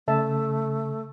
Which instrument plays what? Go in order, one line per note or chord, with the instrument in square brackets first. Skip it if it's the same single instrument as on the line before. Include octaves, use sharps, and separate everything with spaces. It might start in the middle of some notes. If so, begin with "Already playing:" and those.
[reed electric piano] C#3 [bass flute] A3 [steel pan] A4 E5 A5